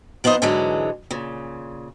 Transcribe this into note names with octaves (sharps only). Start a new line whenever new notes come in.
F3 B3 D#4 C5 D#5
G#2 D3 E3 F#3 G#3
A#2 C#3